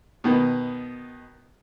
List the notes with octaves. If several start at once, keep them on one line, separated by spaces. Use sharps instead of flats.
B2 D#3 B3